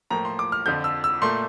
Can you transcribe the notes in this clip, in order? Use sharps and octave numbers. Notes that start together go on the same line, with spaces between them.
A2 F3 A#3 A#5
C6
D6
F6
F2 D3 F3 G6
E6
E6
A#2 A3 C6